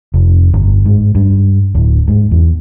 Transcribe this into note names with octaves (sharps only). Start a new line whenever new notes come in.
F1
G1
G#2
G2
D1
G#2
E2